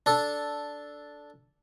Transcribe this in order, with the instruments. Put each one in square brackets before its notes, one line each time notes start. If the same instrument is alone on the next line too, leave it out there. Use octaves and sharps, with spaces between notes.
[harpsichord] D4 A4